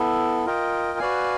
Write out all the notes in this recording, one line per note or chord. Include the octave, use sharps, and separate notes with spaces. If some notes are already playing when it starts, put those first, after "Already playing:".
Already playing: B3 E4 A4
F4 A#4 D#5 G5
F#4 B4 D5 F5 G#5